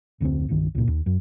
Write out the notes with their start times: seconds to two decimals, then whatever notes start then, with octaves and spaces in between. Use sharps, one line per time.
0.21 F1 D2 G#2 C4
0.49 G1 C2 D#3
0.75 C#2 A#2
0.88 D#2
1.06 F#2